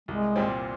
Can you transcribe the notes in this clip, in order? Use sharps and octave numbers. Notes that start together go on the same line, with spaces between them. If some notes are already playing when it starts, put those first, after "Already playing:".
C2 G#3
A#2 G3 C4